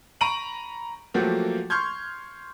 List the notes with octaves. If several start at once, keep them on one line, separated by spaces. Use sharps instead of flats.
A#5 B5 C#6 D7 D#7 F#7
F3 F#3 A3 A#3 F#4 G4
C6 C#6 F6 G6 G#6